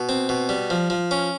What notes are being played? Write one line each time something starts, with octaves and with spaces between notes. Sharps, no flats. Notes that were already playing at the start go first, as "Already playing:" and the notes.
Already playing: B2
C4
B2
G3
F3
F3
C#4